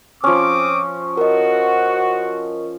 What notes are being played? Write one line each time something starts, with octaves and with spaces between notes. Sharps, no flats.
F3 C4 C#4 D6 D#6
F#4 A#4 D#5